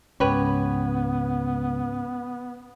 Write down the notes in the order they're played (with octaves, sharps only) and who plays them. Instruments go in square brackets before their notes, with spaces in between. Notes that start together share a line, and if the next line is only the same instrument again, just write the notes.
[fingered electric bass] C#2 [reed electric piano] G#2 C#4 [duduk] B3 [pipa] G4 B4 C#5